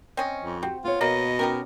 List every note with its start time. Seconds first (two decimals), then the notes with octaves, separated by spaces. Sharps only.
0.17 C4 C#4 D#5
0.42 F2
0.63 C4 F#4 G4
0.84 B3 F4 C#5
1.01 B2 A#3 D#5
1.39 C#4 D#4 G4 A#4